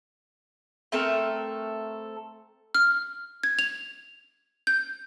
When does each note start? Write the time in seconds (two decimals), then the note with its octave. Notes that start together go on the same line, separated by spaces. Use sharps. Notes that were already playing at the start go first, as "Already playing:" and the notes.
0.92 A3 C4 A4 A#4
2.75 F6
3.43 G#6
3.59 F7
4.67 G6